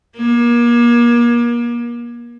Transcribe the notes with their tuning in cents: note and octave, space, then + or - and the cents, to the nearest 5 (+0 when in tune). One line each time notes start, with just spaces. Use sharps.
A#3 +35